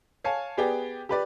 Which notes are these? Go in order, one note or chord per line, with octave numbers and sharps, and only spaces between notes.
C#5 F5 G#5 A5
B3 G4 G#4 D5 G5
G4 B4 D5